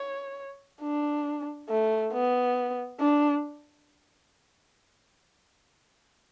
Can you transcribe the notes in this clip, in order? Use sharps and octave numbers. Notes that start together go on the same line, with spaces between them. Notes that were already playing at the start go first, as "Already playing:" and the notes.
Already playing: C#5
D4
A3
B3
D4